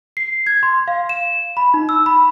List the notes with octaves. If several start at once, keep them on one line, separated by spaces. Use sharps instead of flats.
C7
G#6
C6
F5
E7
B5
D#4
E6
B5